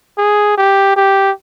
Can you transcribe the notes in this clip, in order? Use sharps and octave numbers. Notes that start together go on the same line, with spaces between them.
G#4
G4
G4